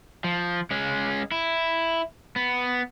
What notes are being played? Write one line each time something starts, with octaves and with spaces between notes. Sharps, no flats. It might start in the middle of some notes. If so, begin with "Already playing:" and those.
F3
G#3 C#4
E4
B3